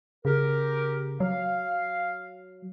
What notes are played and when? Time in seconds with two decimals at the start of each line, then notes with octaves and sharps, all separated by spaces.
0.25 C#3 G4 A#4
1.20 F#3 F5